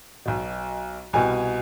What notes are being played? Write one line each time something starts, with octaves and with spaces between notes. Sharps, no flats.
B1 B2
C2 B2 G#5